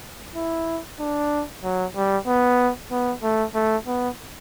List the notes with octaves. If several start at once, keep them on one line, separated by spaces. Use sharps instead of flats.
E4
D4
F#3
G3
B3
B3
A3
A3
B3